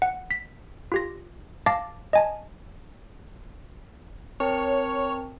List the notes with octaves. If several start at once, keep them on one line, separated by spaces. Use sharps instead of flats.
F#5
B6
F4 G4 A#6
F5 A5 D6 A6 A#6
D#5 G#5 A5
C4 A#4 C#5 A5